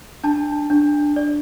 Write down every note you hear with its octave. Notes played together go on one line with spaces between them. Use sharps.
D4 A5
D4
D5